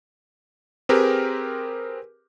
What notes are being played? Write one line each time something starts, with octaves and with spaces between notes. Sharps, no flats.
C4 G4 G#4 A#4 B4